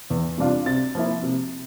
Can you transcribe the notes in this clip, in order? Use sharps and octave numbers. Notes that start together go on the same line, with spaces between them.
E2
C3 G3 D4 F4
C3 A6
F3 A#3 E4
C3